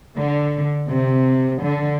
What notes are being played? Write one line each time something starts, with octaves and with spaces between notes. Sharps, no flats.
D3
C3
D3